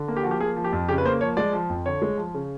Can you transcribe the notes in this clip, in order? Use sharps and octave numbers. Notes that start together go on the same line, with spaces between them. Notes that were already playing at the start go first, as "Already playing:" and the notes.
Already playing: D3
A#3
G4
F3 F#4
G4
A#3 G#4
F3
G4
F2
C#3 G4
B4
A#3 C5
F3 C#5
G#3 D5
F3
F2
D3 C#5
G#3
F3
C#3